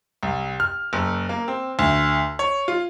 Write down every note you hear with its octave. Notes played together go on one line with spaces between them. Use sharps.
C2
F6
F#1
A#3
C4
D2
C#5
F4